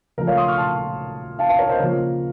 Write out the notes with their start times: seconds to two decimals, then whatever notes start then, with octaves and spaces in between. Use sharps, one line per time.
0.18 C#3 F3 A3 A#4
0.27 C#5 F5
0.37 C6 D#6
0.48 C#6 F6
0.58 A5 C6
1.39 F5 A5
1.49 F5 A5
1.59 A#4 C#5
1.69 C5 D#5
1.79 C#3 F3 A#3 F4 A#4 C#5